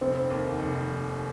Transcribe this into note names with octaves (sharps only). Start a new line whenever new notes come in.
F1 C4
D#2 D#3
F1